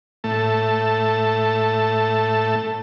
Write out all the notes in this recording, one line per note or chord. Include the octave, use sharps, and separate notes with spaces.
A2 A3 A5